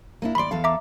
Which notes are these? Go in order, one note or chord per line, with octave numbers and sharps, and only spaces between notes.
A#3 D4 E4
D#2 D5 B5 C6
E2 A4 F5
E5 A#5 D6